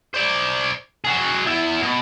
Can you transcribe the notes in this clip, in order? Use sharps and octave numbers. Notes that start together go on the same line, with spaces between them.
C5 D5
F#4 G#4
E2 E4
B2